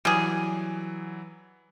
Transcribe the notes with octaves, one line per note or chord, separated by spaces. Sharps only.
E3 F#3 G3 G#4